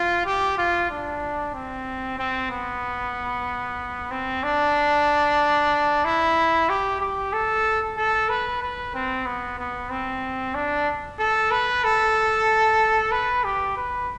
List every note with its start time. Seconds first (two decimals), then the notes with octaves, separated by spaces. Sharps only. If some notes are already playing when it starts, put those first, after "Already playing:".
Already playing: F4
0.26 G4
0.58 F4
0.90 D4
1.54 C4
2.19 C4
2.50 B3
4.11 C4
4.44 D4
6.04 E4
6.69 G4
7.01 G4
7.33 A4
7.98 A4
8.29 B4
8.62 B4
8.94 C4
9.26 B3
9.58 B3
9.90 C4
10.55 D4
11.19 A4
11.51 B4
11.84 A4
13.12 B4
13.44 G4
13.77 B4